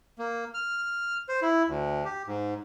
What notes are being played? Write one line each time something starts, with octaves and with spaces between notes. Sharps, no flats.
A#3
F6
C5
E4
D2
G4
G#2